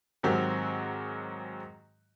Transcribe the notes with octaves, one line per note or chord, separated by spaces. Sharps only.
G#2 D#3 F#3 C4 F#4 G4